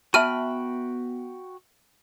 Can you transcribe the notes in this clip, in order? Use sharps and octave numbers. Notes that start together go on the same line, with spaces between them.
B3 F#4 E5 G5 A5 B5 F6 D#7